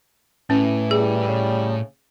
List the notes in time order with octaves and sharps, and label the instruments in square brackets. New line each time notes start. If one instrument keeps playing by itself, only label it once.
[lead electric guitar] A2 [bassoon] E3 [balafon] C#4
[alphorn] G3 [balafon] G#4
[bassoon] C#3